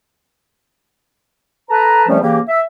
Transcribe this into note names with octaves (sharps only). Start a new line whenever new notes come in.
A4 B4 A5 A#5
E2 F3 G3 A3 C4 C#4
C#3 E3 A#3 G4
E5